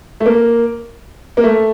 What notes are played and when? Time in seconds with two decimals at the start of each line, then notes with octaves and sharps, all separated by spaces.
0.20 A3
0.26 A#3
1.37 A#3
1.43 A3